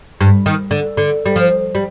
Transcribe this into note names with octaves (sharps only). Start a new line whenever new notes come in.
G2
D#3
D3
D3
G3
F3
G3